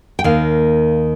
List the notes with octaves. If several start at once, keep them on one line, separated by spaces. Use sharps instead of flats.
G5
D#2 D#3 A#3 F5